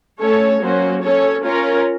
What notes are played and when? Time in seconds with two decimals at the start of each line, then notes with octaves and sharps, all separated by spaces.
0.19 A3 C#4 A4 C#5
0.60 F#3 A#3 C#4 F#4 C5
1.02 C#4 A4 C#5
1.43 C#4 F4 A#4 C#5